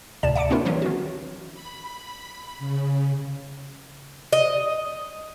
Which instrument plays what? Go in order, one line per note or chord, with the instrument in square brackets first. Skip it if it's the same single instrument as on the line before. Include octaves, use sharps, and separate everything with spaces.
[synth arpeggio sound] D2 A2 C3 D5 A5 E7
E5 F#5 A5 D6 C#7 D7
A#3 C4 D4 E4 F4 A#4
E3 F#3 C#4
D#3 F#4
[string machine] B5
C#3
[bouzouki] D#5